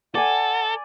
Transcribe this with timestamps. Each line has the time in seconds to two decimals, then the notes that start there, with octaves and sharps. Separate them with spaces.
0.15 A4 D5 F#5 G#5